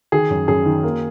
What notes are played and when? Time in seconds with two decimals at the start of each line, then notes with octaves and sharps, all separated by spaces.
0.12 D#3 G#4
0.30 F#2
0.48 F#2 G#4
0.66 D#3
0.83 A#3